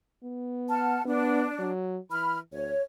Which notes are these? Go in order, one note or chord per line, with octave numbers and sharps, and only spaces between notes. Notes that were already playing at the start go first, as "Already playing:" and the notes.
B3
F#5 A5 F6
B3 D4
F#3
E3 B5 F6
D2 C#5